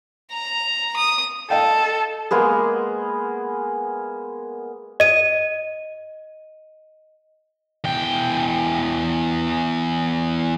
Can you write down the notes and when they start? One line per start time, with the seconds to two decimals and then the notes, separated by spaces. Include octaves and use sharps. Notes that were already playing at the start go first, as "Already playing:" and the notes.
0.32 A#5
0.96 D#6
1.50 A4 D#5 F5 G5
2.31 G#3 A#3 B3 G#4
5.00 D#5 D#7
7.84 E2 G5